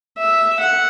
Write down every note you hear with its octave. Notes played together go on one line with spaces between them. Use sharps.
E5
F#5